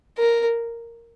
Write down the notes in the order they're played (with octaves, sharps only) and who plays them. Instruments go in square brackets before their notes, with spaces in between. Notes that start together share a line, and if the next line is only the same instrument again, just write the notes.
[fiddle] A#4